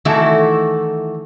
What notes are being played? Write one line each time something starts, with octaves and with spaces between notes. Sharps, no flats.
D#3 E3 A3 E4 F#4 A4